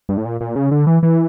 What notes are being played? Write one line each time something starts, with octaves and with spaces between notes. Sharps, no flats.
G2
A2
A#2
A#2
C#3
D3
E3
E3